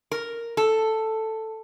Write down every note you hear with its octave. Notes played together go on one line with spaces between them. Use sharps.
A#4
A4